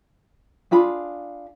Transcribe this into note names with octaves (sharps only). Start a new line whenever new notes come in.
D4 F4 G#4 B5